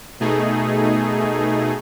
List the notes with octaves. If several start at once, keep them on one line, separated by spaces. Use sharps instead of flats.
B2 A3 D#4 G#4